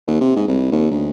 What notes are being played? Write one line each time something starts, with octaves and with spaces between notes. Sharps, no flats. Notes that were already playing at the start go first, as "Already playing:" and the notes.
D#2
C3
G#2
C2
D#2
D2